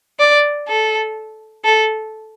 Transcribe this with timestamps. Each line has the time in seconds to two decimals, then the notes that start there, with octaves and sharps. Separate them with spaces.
0.19 D5
0.68 A4
1.64 A4